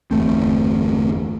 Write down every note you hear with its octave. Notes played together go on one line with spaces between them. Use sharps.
G1 E2 A3 C4